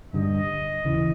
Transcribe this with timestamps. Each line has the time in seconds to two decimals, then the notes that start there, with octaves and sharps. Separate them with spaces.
0.13 G2 D3 G3 D#5
0.85 D#2 C#3 E3